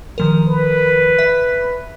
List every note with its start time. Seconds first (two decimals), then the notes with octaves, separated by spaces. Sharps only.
0.18 D#3 F3 A#4
0.47 B4
1.19 E5